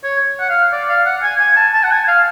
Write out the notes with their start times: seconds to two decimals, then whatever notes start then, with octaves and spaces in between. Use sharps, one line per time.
0.04 C#5
0.39 F#5
0.49 F5
0.72 D5
0.89 F5
1.06 F#5
1.23 G#5
1.40 G#5
1.56 A5
1.73 A5
1.83 F#5
1.91 G#5
2.08 F5